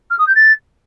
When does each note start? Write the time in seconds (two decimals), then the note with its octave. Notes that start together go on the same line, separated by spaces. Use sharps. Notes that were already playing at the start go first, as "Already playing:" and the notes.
0.10 F6
0.19 D#6
0.27 G6
0.35 A6